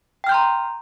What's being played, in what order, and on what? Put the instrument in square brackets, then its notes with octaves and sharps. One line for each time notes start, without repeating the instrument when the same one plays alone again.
[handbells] G5
F6
G6
C6
A#5